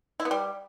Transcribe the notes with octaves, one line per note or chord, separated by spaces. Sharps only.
E4
B3
G3